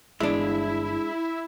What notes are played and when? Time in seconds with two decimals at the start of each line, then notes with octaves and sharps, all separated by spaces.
0.20 G1 E3 G#3 D4 E4